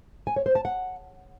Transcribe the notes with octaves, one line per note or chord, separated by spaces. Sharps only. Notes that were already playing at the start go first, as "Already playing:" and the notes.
G#5
C#5
C5
A5
F#5